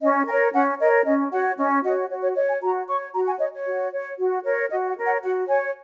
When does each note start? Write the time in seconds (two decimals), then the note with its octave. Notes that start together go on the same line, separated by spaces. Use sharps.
0.01 C#4 D#5
0.27 A#4 G#5
0.31 C#5
0.53 C#4 F#5
0.79 A#4 C#5 D#5
1.05 C#4 D#5
1.31 F#4 C#5 F#5
1.58 C#4 D#5
1.83 F#4 C#5 D#5
2.10 F#4 C#5
2.23 C#5
2.36 C#5 D#5
2.49 G#5
2.62 F#4 A#5
2.88 C#5 C#6
3.14 F#4 A#5
3.27 G#5
3.39 C#5 D#5
3.53 C#5
3.66 F#4
3.93 C#5
4.18 F#4
4.44 A#4 C#5
4.70 F#4 D#5
4.88 F#5
4.97 A#4 C#5
5.05 F#5
5.22 F#4 F#5
5.48 C#5 G#5